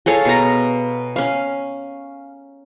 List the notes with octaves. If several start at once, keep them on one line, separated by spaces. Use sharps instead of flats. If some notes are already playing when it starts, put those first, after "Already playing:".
G#4 A4 C#5 F5
B2 A#5
C#4 F5